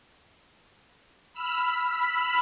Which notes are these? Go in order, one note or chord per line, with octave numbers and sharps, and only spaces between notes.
B5 E6 F6